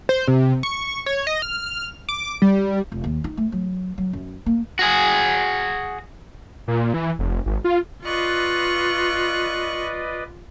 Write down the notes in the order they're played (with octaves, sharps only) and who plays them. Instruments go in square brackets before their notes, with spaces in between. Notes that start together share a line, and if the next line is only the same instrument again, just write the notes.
[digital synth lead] C5
C3
C#6
C#5
D#5
F6
D6
G3
[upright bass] F1
D#2
D#4
A3
F#3
F#3
F#2
A#3
[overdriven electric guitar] F#4 G#4
[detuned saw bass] A#2
E3
F1
G#1
F4
[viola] F4 [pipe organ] B4 D5 D#5 [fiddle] C#6 F#6